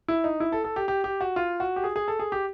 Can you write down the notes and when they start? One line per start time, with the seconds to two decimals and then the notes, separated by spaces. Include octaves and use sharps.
0.08 E4
0.24 D#4
0.40 E4
0.52 A4
0.64 A4
0.76 G4
0.88 G4
1.04 G4
1.21 F#4
1.36 F4
1.60 F#4
1.76 G4
1.84 G#4
1.96 G#4
2.08 A4
2.19 G#4
2.32 G4